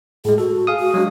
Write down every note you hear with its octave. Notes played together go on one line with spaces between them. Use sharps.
A2 G#3 G#4
F#4 A4
G#4 F5 D#6
F#4
F#3 G#3 D4